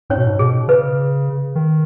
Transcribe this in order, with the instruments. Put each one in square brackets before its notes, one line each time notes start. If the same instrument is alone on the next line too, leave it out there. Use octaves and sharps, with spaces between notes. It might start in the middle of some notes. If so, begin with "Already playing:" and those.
[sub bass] G#2 [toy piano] C#4 C#5
[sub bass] B2
G#2
[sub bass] B2 [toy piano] G#4
[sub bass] C#3 [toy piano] B4
[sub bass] D#3